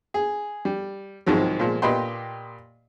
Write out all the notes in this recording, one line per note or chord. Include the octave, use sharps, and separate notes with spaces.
G#4
G3
C2 G#2 D#3 F3 F#3 G#3
A#2 F3 G#3
A#2 G4 B4 D#5 G5 C6